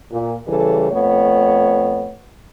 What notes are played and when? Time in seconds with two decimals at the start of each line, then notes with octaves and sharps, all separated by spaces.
0.11 A#2
0.47 C#3 E3 G3 A4
0.91 F2 A3 B3 C#5